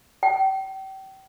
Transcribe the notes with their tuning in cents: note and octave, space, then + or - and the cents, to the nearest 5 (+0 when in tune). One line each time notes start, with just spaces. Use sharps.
G5 -35